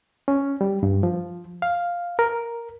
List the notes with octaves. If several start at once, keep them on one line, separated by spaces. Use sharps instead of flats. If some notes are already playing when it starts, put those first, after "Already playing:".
C#4
G3
G2
F3
F5
A#4